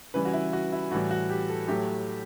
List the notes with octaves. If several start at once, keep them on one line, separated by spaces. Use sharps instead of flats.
C#3 E3 G3 B4
F#4
E4
F#4
E4
A2 E3 G3 F#4
F#4
G4
A4
A2 F#3 A3 G4